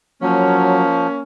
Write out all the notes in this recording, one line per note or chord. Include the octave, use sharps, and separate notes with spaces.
F3 F#3 A#3 C#4